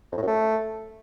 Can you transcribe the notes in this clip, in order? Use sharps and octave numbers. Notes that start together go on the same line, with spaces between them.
F2
A2
F#2
A3